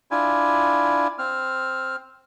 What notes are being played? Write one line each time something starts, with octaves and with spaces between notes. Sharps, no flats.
D4 E4 F4 G#5
C4 F6